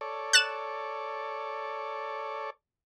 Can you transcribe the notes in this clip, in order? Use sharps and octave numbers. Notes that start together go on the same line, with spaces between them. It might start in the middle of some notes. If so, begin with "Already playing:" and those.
A4 C#5 D5
F#6 A6 E7